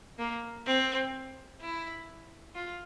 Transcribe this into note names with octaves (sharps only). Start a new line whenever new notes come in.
A#3
C4
E4
F4